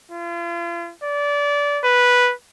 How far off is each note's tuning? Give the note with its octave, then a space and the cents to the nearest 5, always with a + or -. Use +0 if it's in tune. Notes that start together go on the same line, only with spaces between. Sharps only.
F4 -40
D5 -25
B4 -5